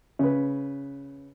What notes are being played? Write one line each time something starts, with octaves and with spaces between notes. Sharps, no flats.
C#3 B4